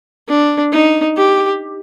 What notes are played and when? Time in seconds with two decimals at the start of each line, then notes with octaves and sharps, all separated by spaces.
0.29 D4
0.72 D#4
1.17 G4